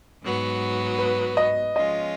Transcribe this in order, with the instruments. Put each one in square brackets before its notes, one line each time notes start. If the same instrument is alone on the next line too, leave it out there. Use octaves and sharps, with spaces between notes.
[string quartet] G#2 F#3 B3
[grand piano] B4
D#5
[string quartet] F3 G#3 C#4 F4 [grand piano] D#5